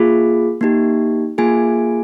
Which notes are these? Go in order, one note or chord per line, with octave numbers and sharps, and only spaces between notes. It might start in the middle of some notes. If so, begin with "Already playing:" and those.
Already playing: A#3 F4 G#4
A#3 D#4 G4
A#3 F4 G#4 G#5